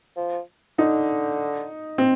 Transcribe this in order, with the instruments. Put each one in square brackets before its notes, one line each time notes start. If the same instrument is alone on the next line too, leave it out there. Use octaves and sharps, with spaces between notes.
[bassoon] F3
[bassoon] D3 [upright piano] D#4
[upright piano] C4